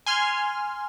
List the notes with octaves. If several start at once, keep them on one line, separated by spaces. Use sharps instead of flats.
G#5 C6 F6